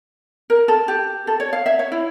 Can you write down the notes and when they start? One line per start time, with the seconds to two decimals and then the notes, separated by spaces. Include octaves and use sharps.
0.50 A#4
0.68 A4
0.88 G4
1.27 A4
1.40 C#5
1.53 F5
1.66 E5
1.79 C#5
1.92 E4